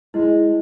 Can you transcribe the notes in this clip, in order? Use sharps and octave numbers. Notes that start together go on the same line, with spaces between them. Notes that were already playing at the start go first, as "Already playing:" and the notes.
G#3 E4